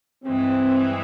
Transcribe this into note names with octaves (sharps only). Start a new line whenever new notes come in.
G2 E3 G#3 C4